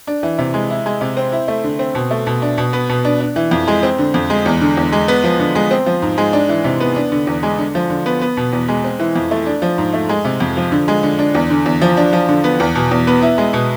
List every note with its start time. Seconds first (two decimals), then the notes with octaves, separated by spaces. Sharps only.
0.07 D4
0.23 E3
0.38 C3
0.54 G#3
0.70 E4
0.86 G#3
1.01 C3
1.17 C4
1.32 E4
1.48 A3
1.64 D3
1.79 C4
1.95 B2
2.11 A3
2.27 B2
2.42 D4
2.58 B2
2.73 B3
2.89 B2
3.05 D4
3.20 D4
3.36 E3
3.51 F2
3.68 G#3
3.83 C4
3.98 D3
4.14 F2
4.30 G#3
4.46 E2
4.61 D3
4.77 E2
4.92 G#3
5.08 B3
5.24 F3
5.40 D3
5.55 G#3
5.71 C4
5.86 F3
6.02 G#2
6.18 G#3
6.33 D4
6.49 E3
6.64 C3
6.80 B3
6.96 D4
7.12 D3
7.27 E2
7.43 G#3
7.58 D3
7.75 F3
7.90 D3
8.06 B3
8.22 B3
8.37 B2
8.53 E2
8.68 G#3
8.84 C4
9.00 E3
9.16 F2
9.31 A3
9.46 D4
9.62 F3
9.78 G#2
9.93 A3
10.09 G#3
10.25 C3
10.40 F2
10.57 F3
10.72 D3
10.88 G#3
11.03 D3
11.19 D4
11.35 E2
11.50 D3
11.66 E2
11.81 F3
11.97 D4
12.13 F3
12.29 D3
12.44 B3
12.60 E2
12.75 B2
12.91 E2
13.07 B3
13.22 E4
13.38 G#3
13.53 B2